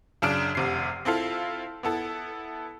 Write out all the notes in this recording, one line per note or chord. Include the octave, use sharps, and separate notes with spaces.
F#2 C#3 D4 F6 D7
F1 C3 C7
C4 E4 F4 A4 F5
B3 E4 A4